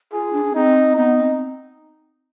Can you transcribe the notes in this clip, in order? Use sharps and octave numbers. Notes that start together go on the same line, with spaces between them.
F4 G#4
D4
D4
C4 D#4
B3 D#4
C4